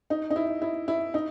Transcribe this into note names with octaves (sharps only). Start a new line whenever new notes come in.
D#4
D#4
E4
E4
E4
D#4